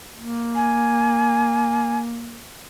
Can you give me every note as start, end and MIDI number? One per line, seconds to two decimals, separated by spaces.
0.17 2.45 58
0.55 1.99 80